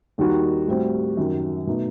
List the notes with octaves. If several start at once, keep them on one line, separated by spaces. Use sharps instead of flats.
D#2 D#3 G3 D#4 F#4
A2 G3 C4 F#4
F#2 D#3 F#3
B2 A3 D#4